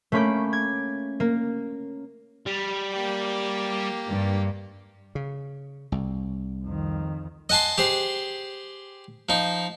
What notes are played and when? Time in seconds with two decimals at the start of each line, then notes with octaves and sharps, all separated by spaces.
0.12 A3 A#3 C#4 B5 D6 G6
0.53 G#6
1.20 A#3
2.46 G3
2.93 A#3 G4
4.08 G2
5.15 C#3
5.92 C2
6.64 F2 D#3
7.49 D#5 F#5 G#5 A5 C6
7.78 G4 G#4 C5
9.29 F3 D#4